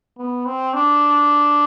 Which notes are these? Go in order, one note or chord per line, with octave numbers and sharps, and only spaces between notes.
B3
C4
D4